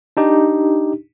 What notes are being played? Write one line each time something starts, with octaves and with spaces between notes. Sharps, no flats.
D4 D#4 G4